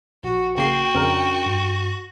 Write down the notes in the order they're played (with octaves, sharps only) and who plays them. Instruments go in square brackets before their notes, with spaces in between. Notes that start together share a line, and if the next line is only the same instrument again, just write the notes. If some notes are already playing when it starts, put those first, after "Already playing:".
[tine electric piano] A#1 [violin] F#4
[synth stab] C#3 A#3 C7 [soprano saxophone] F#4 [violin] G5
[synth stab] F2 C#3 A#4 [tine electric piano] C#4 D4
[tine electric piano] G2